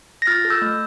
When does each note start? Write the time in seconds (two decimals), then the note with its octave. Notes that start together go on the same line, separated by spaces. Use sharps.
0.22 A#6
0.27 F4 F6 A6
0.45 A4
0.50 E6 G6
0.62 A3